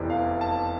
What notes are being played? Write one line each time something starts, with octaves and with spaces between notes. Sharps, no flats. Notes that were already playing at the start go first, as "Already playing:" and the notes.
Already playing: F1 E2 C3 E3 D5
F5
A5